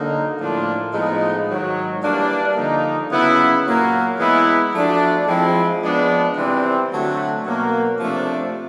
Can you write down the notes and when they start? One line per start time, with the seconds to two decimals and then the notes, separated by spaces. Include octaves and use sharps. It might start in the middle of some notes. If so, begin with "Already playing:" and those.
Already playing: D3 F#3 A#3 D#4
0.39 A2 F3 A#3 D4 F4
0.93 A2 F3 G#3 B3 D#4
1.48 G#2 D#3 F#3
2.02 E3 G3 A#3 D4
2.56 D3 F3 A#3 D#4
3.11 C#3 F#3 B3 E4
3.65 A#2 F#3 A#3
4.19 E3 G#3 B3 E4
4.74 F3 A3 D4 F#4
5.27 F3 G#3 C4 E4
5.82 F3 G#3 B3 D4
6.36 C3 E3 G3 C4
6.90 D3 F#3 A3 D4 F#4
7.44 B2 F#3 A#3
8.00 C3 F3 A3 D4